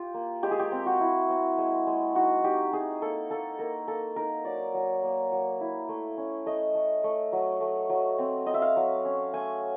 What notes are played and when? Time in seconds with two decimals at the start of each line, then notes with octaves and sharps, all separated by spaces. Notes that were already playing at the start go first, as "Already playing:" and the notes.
Already playing: F4 G4
0.14 A#3
0.43 G#3 G4
0.51 G#4
0.59 G4
0.72 C4
0.86 F#4
1.00 E4
1.30 C4
1.58 G#3
1.87 G#3
2.15 D#4 F#4
2.44 D#4 G4
2.73 D#4 G#4
3.02 A#3 A4
3.30 A#3 A4
3.59 A#3 A#4
3.87 A#3 A4
4.16 D#4 A#4
4.45 F#3 D5
4.74 F#3
5.03 A#3
5.32 F#3
5.61 E4
5.89 A3
6.17 C#4
6.46 A3 D#5
6.75 A3
7.04 A3
7.32 F#3
7.61 A3
7.89 F#3
8.19 C4
8.46 C4 D#5
8.54 E5
8.62 F5
8.76 F#3
9.05 C#4
9.33 A3 G#5